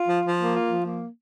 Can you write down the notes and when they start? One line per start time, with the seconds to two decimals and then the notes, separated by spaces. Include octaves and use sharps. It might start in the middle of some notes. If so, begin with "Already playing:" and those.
Already playing: F4
0.08 F3
0.24 F3
0.39 A#3
0.55 F4
0.69 F3
0.84 A#3